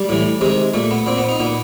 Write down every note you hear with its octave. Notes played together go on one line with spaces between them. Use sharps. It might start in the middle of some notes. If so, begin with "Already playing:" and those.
Already playing: G3
A2 E3
C3 D#3 G#3
A#2 A3
B3
A#2 C4
B3
D#4
A#2 B3